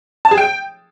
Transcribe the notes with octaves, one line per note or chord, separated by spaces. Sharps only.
A5
G#4
G5